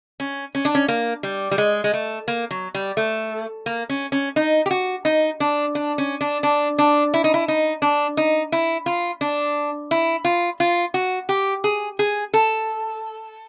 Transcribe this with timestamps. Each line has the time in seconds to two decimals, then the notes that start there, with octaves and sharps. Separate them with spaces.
0.20 C#4
0.55 C#4
0.65 D4
0.75 C#4
0.88 A#3
1.23 G3
1.51 G3
1.58 G#3
1.84 G#3
1.94 A3
2.28 A#3
2.51 F#3
2.75 G3
2.97 A3
3.66 A#3
3.89 C#4
4.12 C#4
4.36 D#4
4.66 G4
4.71 F#4
5.05 D#4
5.40 D4
5.75 D4
5.98 C#4
6.21 D4
6.43 D4
6.78 D4
7.14 E4
7.24 D#4
7.34 E4
7.48 D#4
7.82 D4
8.17 D#4
8.52 E4
8.86 F4
9.21 D4
9.91 E4
10.25 F4
10.60 F4
10.94 F#4
11.29 G4
11.64 G#4
11.99 G#4
12.34 A4